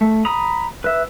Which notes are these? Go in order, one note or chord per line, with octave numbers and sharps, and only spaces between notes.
A3
A#5 B5 D#6
B4 E5